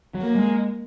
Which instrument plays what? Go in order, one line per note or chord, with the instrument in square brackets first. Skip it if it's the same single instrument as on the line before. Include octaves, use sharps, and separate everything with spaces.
[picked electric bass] F#3
[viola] A#3
[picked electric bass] G#3